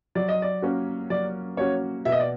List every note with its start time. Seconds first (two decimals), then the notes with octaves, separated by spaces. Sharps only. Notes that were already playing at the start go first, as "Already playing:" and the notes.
0.15 F#3 D5
0.29 D#5
0.42 D5
0.62 A#3 C#4 F#4
1.10 F#3 D5
1.57 A#3 C#4 F#4 C#5
2.05 B2 E5
2.12 D#5
2.20 D5